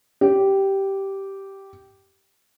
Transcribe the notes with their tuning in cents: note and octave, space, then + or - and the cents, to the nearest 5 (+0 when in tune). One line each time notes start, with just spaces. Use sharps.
G4 -10